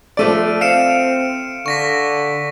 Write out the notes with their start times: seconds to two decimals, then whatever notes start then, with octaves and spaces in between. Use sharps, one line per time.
0.17 F3 A3 D5 D7 D#7
0.61 C4 F5 C#7 D7 E7
1.66 D3 C#6 A#6 B6